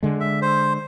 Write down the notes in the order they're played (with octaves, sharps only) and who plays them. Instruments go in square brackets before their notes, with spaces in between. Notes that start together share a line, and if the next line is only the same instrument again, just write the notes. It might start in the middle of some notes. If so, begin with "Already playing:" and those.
[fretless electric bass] D3 G#3
[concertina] E5
C5